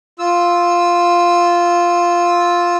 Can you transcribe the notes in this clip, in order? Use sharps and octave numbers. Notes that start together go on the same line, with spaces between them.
F4 E6